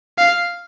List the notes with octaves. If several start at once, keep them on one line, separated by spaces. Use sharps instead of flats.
F5